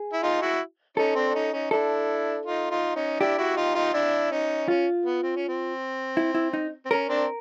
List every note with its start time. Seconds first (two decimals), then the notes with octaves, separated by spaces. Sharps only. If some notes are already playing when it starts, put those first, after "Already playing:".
Already playing: G#4
0.13 E4
0.23 D#4 F4
0.42 E4 F#4
0.97 C#4 D#4 A4
1.16 C4 D4
1.29 D4
1.35 C#4 D#4
1.53 C#4 D#4
1.71 D4 E4 A4
2.45 D#4 F4
2.71 D#4 F4
2.96 C#4 D#4
3.20 D4 E4 G4
3.38 E4 F#4
3.57 D#4 F4
3.75 D#4 F4
3.94 D4 E4
4.31 C#4 D#4
4.68 C#4 F4
5.06 B3
5.23 C4
5.36 C#4
5.49 C4
6.17 E4
6.35 E4
6.53 D#4
6.85 C4
6.90 C#4 A#4
7.09 C4 D4